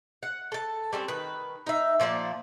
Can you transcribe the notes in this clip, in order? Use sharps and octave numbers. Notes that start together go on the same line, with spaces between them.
F#5
A4 A5
G3 C4 C#4
D#3 B4
D#4 E5
A#2 F3 A#3 D5